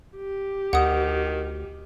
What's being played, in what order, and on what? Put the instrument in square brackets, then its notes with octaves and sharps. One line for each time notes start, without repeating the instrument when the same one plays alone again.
[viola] G4
[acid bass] D2 [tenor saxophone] D#3 [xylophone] F#5 D#6